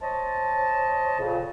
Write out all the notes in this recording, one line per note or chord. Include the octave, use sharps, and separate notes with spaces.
C5 C#5 D#5 A5
F2 A#2 C#3